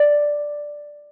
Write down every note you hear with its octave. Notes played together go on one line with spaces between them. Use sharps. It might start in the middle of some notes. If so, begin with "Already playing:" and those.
Already playing: D5